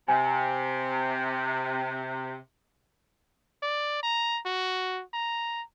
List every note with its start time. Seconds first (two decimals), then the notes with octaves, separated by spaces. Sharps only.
0.08 C3 G#5
3.63 D5
4.03 A#5
4.46 F#4
5.14 A#5